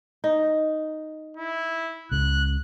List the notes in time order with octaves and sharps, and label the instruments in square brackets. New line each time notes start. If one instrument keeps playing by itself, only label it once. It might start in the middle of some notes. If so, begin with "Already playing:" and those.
[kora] D#4
[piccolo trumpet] E4
[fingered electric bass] C#2 C#3 [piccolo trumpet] F#6